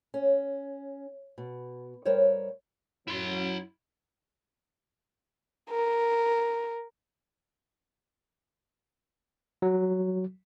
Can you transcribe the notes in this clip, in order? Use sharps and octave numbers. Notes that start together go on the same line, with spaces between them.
C#4
B2
G3 A#4 C5 C#5
F#2 F#3 E4 C6
A#4
F#3